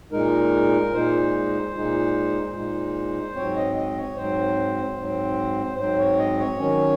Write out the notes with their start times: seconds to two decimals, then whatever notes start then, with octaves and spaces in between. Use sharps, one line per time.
0.12 A#2 G#3 D#4 A#4
0.93 A#2 G#3 D#4 C5
1.74 A#2 G#3 D#4
2.55 A#2 G#3 D#4
3.35 G#2 F#3 C4 C#5
3.56 D#5
3.76 D#5
3.96 C#5
4.16 G#2 F#3 C4 C5
4.97 G#2 F#3 C4
5.77 G#2 F#3 C4 C5
5.98 C#5
6.18 D#5
6.38 C#5
6.59 D#3 F#3 C#4